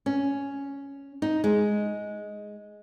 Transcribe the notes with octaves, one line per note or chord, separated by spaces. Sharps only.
C#4
D#4
G#3